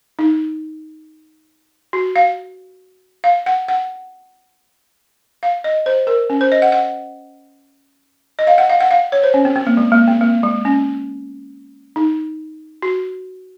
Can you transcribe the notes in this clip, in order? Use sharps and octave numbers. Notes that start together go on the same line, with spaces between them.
D#4
F#4
F5
F5
F#5
F#5
F5
D#5
C5
A#4
C#4
C5
D#5
F#5
F#5
D#5
F5
F#5
F5
F#5
F5
C#5
C5
C#4
C4
C4
A#3
G#3
A#3
C4
A#3
G#3
C#4
D#4
F#4